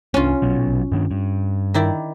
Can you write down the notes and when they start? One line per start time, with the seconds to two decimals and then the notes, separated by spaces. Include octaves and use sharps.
0.14 C2 C#4 D4 F4
0.42 A#1 B2 F#3
0.92 G2 D#3 D4
1.11 G2
1.74 D#3 E4 D5